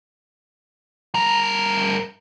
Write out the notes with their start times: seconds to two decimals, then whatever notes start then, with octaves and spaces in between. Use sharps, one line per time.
1.14 G2 A#4